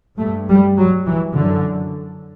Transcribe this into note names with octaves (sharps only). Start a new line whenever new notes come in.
G2 A3
G3
F#3
E3
F#2 D3